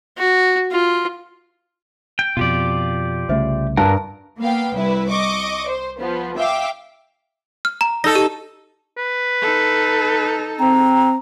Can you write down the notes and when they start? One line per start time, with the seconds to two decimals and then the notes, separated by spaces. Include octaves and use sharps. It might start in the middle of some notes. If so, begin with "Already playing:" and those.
0.18 F#4
0.72 F4
2.19 G5
2.37 F2 B2 F4 G4 D5
3.29 C2 C#3 A3 C5 E5
3.77 G2 A#4 A5 F#6
4.38 A#3 B3 F5 G5
4.74 C2 E4 B4
5.09 D#5 C#6 D6
5.66 C5
5.98 F3 B3
6.37 E5 F5 G5 D6
7.65 F6
7.81 A#5
8.04 D#4 A4 A#6
8.15 G4
8.97 B4
9.42 D#4 A4
10.59 C4 A#5